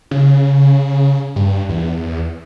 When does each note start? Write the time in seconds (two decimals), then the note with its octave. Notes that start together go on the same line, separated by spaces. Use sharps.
0.11 C#3
1.36 G2
1.69 E2